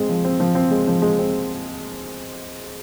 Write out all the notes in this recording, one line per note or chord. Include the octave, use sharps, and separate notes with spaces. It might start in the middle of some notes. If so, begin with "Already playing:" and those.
Already playing: G#3 C4
F3
C4
F3
C4
G#3
F3
G#3
C4